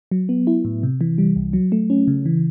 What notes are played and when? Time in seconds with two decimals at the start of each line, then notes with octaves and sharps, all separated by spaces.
0.11 F#3
0.29 B3
0.47 E4
0.65 A2
0.83 C3
1.01 E3
1.18 G3
1.36 C2
1.53 F#3
1.72 A3
1.90 C#4
2.08 C#3
2.26 E3